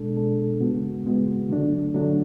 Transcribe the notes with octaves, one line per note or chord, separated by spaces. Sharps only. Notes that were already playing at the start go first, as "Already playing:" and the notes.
Already playing: B2 G#3 D4 A4
B2 G#3 D4 A4
C#3 G#3 B3 F#4
C#3 G#3 B3 F#4
D3 F#3 A3 D4
D3 F#3 A3 D4